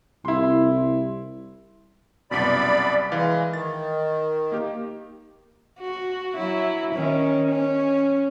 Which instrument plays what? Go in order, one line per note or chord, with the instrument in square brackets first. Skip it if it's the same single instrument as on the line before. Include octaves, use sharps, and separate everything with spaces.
[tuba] C2 [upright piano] E4 C6
[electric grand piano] C2 F#2 B2 [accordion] D5 B5
[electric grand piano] E3 F5 [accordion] G#3
[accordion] D#3 [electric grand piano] A6
[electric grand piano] A#3 G4
[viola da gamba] F#4
F#3 E4
D#3 C#4
C#4